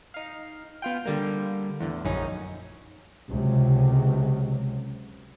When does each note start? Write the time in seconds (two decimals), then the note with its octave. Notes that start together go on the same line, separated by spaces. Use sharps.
0.14 D#4 F5
0.82 B3 F4 G5
1.05 D3 G3 A#3
1.80 E2 A2 D3
2.04 A#1 F#2 C#4 D#4
3.29 C#2 C3 F#3